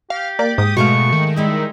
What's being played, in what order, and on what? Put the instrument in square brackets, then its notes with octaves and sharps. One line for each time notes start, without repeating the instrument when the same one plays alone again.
[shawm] G4 [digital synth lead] F5
[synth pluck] A#3 [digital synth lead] D5
[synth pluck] G#2 [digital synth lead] D#6
[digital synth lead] B2 [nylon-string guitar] G#3 A3 F5 [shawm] C#6
[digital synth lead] D#3
[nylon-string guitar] G3 G#3 D#4 [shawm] E4